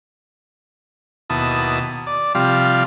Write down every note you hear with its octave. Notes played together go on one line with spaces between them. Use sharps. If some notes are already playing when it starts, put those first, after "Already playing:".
D#2 B2 E4 A5 D#6
D5
C3 F3 G3 F5